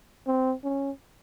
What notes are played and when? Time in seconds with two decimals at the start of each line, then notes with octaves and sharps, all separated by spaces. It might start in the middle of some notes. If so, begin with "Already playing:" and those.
0.27 C4
0.64 C#4